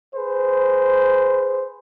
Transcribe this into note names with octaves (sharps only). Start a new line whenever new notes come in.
G#4 B4 C5